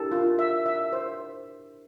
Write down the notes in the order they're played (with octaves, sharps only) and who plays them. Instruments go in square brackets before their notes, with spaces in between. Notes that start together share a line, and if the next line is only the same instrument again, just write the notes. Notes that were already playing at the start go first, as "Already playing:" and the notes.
Already playing: [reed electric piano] D4 E4 G4 A#4 [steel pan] A4
[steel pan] F4
E5
E5
C5